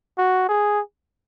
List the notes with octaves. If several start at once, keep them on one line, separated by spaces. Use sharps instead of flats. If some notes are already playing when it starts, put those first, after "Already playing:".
F#4
G#4